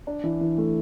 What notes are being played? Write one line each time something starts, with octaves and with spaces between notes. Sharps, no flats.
D4
E3
E3
A3